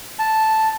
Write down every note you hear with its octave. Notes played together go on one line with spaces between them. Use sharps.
A5